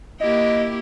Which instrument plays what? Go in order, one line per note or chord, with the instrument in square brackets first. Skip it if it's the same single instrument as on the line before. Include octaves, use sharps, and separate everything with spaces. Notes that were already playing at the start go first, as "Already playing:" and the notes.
[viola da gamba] A#3 E4 G4 [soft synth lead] D#5